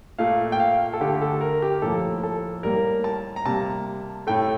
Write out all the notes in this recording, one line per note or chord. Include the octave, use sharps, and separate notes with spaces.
A#2 A3 F5
G5
F5
A4
D3 A3 G4
A4
A#4
G4
A2 F3 A#3 A4
A4
A2 G3 A#3 A#4
A5
A#5
C3 G3 A#3 A5
A2 A3 G5